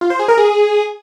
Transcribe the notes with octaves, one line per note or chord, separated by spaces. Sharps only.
F4
C5
G#4
A#4
G#4